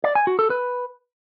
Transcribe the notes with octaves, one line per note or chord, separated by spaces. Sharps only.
D5
G#5
F#4
A4
B4